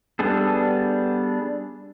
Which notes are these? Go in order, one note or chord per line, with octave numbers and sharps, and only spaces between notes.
G3 B3 D4 G#4 A4